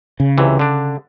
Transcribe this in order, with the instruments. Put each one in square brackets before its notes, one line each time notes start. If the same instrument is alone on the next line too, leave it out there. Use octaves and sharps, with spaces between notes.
[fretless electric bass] C#3
[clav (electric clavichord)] C#2 C3 E3
D3 D4